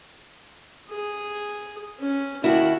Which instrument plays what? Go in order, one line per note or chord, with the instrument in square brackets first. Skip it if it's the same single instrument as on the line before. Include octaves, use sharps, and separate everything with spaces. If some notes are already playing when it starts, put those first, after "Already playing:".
[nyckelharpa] G#4
C#4
[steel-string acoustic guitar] D#2 E4 [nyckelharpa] F#4 A#4